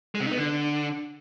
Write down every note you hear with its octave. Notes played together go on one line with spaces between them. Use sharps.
G#3
C3
D#4
B3
D3